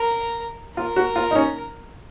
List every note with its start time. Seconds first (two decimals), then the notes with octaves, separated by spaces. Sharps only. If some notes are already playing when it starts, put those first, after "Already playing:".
Already playing: A#4
0.77 F4 A#4
0.96 F#4
1.16 F4
1.31 D#4
1.35 C#4